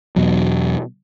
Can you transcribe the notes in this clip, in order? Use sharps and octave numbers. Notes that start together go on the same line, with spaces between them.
E2 B2 F#3